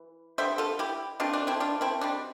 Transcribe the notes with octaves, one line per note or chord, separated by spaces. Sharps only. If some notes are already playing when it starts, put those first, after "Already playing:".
Already playing: E3
D3 G3 B3 C5 E5
F4 A4
E4 G4
B2 A3 C4 D4 F4
D4
C4 E4
D4 F4
C4 E4
B2 G3 C4 D4